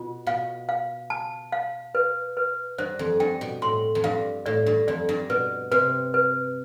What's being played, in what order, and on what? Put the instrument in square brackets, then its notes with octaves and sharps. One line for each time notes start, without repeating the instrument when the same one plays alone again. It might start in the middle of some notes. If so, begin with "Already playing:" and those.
Already playing: [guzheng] B2 [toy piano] F4
[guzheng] B2 [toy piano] F5
[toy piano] F5
A5
F5
B4
B4
[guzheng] G2 [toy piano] C5
[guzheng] F2
[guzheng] G2 [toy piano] G5
[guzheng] B2
[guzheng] A2 [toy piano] C6
[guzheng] F2
[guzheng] G2 [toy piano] F5
[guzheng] A2 [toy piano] D5
[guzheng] G2
[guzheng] F2 [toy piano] D5
[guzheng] G2
[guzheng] B2 [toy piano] B4
[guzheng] C3 [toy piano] B4
[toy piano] B4